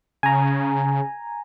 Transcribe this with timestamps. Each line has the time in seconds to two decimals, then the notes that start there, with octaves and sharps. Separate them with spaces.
0.23 C#3 G#5 A#5